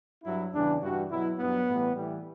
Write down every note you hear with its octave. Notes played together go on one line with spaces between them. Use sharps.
G2 F#3 E4
E2 C#3 E3 G3 D4
G2 E3 G3 F#4
B2 F#3 E4
G2 F#3 B3
A2 E3 G3
A2 E3 G3